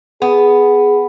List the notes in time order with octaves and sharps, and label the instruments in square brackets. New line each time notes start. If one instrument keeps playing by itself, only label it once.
[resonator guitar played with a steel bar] B3 [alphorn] G#4